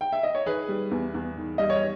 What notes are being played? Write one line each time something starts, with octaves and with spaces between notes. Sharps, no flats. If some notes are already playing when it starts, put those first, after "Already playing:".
G5
E5
D#5
C#5
D#3 G#4 B4
G3
E2
E2
D#3
G3 D#5
C#5